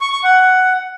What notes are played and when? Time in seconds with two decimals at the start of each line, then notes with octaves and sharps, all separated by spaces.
0.01 C#6
0.12 C#6
0.24 F#5